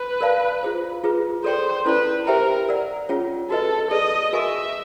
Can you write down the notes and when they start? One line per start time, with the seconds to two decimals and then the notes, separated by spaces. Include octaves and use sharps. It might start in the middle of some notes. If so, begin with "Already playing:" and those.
Already playing: B4
0.21 A#4 D5 F5 A5
0.63 F4 G#4 C5
1.04 F4 G#4 B4
1.44 A4 C5 D5 G5 C6
1.86 C#4 E4 A4 B4 D5
2.27 G4 A#4 C5 E5 G5 A#5
2.69 A#4 D5 F#5
3.09 C#4 F4 G#4 C#5 F#5
3.50 F#4 A4 B4 D#5
3.91 G#4 B4 D5 D#5
4.33 F#4 A#4 D#5 E5 G#5 C#6